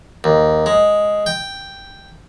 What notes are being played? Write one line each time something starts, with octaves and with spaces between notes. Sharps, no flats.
D#2
G#3
G5